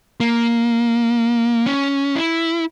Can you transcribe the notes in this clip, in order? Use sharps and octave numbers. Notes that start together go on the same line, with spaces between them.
A#3
C#4
E4